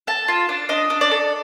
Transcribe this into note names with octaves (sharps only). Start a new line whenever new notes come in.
A4 A5
F4
D4
D4 D#5
D4
D5
A4